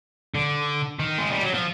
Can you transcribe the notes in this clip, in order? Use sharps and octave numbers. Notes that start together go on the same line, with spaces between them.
D3
D#3
G#3
G3
F#3
F3